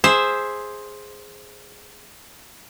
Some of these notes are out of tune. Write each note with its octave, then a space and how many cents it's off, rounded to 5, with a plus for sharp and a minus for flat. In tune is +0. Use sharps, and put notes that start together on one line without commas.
G#4 +0 C5 +5 E5 +0